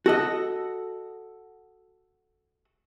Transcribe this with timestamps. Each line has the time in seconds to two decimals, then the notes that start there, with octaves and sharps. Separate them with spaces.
0.06 F#4 A4 D#5